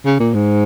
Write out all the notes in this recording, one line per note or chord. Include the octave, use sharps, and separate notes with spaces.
C#3
A#2
G#2